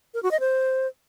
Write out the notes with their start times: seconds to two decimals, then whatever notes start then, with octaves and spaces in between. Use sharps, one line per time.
0.14 A#4
0.23 F#4
0.31 D#5
0.40 C5